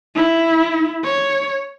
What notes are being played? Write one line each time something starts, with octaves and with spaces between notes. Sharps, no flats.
E4
C#5